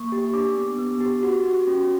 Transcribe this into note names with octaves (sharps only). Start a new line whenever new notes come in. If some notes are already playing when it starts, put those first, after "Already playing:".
Already playing: A#3 C#6
G4
D4 D6
B3
B3
G4
F#4
F#4
C#4